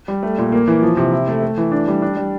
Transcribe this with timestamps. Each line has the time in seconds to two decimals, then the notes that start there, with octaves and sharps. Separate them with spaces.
0.08 G3
0.23 A3
0.38 A#2
0.52 A#3
0.67 E3
0.83 F3
0.97 C3
1.12 E4
1.28 A3
1.43 A3
1.58 E3
1.72 D4
1.88 G3
2.02 D4
2.17 G3